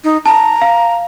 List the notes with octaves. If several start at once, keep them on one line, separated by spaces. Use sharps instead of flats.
D#4
A5 A#5
F5